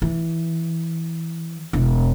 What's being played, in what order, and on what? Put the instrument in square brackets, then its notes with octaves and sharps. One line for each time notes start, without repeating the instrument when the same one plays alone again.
[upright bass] E3
E1